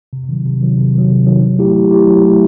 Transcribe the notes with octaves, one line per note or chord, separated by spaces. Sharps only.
C3
D#3 F#3
C3
D#3 F#3
C3
D#3 F#3
C3
D#3 F#3
F#3
A3 E4 G4
F#3
A3 E4 G4
F#3
A3 E4 G4